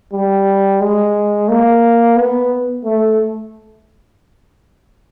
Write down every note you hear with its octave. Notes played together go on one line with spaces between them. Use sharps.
G3
G#3
A#3
B3
A3